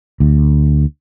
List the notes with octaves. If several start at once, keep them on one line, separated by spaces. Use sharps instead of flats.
D2